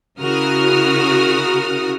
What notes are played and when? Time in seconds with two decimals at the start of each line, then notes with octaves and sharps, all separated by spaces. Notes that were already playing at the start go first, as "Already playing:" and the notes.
0.20 C#3 E4 F#4 A#4 D#6 F6